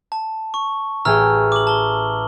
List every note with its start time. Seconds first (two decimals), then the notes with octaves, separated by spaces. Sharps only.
0.12 A5
0.54 C#6
1.05 A1 G#4 G5 A#5 E6 F6
1.52 D6 F#7
1.67 A5 G7